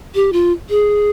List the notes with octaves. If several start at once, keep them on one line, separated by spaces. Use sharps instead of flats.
G4
F4
G#4